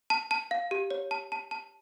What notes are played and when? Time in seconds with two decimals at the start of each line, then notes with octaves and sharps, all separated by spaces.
0.10 A5
0.31 A5
0.51 F5
0.71 G4
0.91 C#5
1.11 A5
1.32 A5
1.51 A5